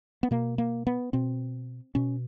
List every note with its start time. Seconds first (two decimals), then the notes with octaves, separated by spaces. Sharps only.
0.23 B3
0.31 B2 A#3
0.58 A#3
0.87 B3
1.13 B2 C4
1.95 B2 C#4